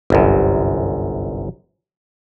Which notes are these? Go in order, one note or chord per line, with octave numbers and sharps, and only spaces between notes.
G1 C2 F#2